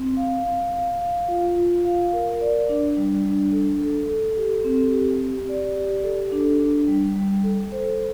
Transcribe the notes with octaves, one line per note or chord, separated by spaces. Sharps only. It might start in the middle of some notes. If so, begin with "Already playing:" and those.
Already playing: C4
F5
F5
F5
F5
F4
F4
F5
A#4
D5
D4
G3
D4
A4
A4
A4
G4
C4
G4
G4
D5
G4
A4
D4
D4
G3
G3
A4
C5